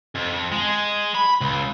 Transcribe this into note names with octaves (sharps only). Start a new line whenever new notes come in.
F2
G#3
B5
C#2